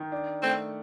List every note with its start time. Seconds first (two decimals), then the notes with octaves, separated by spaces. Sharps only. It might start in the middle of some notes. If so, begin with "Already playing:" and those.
Already playing: D#3
0.12 D4
0.42 A3 C4